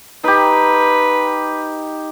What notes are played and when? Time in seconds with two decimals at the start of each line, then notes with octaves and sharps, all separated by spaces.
0.24 D#4 G4 B4